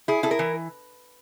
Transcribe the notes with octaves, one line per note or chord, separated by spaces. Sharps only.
E4 G#4
E4 A4
A#4
E3